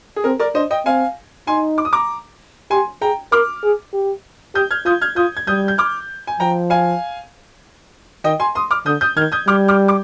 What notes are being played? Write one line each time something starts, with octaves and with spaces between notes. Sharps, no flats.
G#4
C4 A#4
A#4 D5
D4 C5 D#5
D#5 G5
C4 F5 G#5
D#4 G#5 C6
D6
D#6
A#5 D6
G4 G#5 C6
G#4 G5 A#5
A#4 D6 F6
G#4
G4
G4 D#6 G6
F6 G#6
F4 D#6 G6
F6 G#6
F4 D#6 G6
G#6
G3 D#6 G6
G6
D6 F6
G#5
F3 G5 A#5
F5 G#5
D#3 D#5 G5
G#5 C6
C6 D#6
D6 F6
D3 D#6 G6
D#6 G6
D#3 F6 G#6
D#6 G6
G3 D6 F6
D6 F6
D6